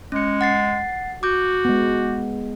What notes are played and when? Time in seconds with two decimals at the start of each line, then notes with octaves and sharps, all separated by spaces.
0.12 G#3 C#4 C#7
0.41 F#5 A6 C7
1.23 F#4 D6 G6
1.65 G#3 B3